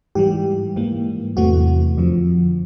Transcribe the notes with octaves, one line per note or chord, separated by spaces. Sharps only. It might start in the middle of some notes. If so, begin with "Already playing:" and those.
G#2 E3 G3 G4
G#2 E3 G3 A#3
E2 C3 E3 A3 F#4
F2 D3 F3